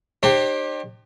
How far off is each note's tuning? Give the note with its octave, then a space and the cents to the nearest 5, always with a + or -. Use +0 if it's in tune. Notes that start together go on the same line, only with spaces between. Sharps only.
D#4 -45 G4 +0 C5 +35